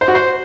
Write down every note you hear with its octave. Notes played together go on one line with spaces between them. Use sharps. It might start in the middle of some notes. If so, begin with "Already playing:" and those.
C5
F#4
C5